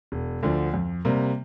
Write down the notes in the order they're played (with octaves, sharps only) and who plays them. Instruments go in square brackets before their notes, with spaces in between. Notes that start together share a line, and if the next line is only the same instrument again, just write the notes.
[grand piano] E1
D2 D3 F3
F2
C3 G3 A#3